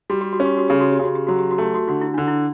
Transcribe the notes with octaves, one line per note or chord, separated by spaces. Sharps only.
G3 F#4
G4
F#4
C#4
G4
F#4
C#3 G4
F#4
G4
C#3 F#4
G4
F#3 F#4
G4
F#4
A3 G4
F#4
D3 F#4
E4
D3 D4
E4